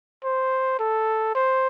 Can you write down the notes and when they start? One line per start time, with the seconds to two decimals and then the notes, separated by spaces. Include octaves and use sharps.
0.24 C5
0.79 A4
1.35 C5